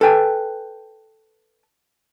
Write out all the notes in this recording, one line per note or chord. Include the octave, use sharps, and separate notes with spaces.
A4 B4 G5 G#5